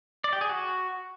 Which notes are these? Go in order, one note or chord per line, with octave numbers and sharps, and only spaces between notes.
D5
G4
G#4
F#4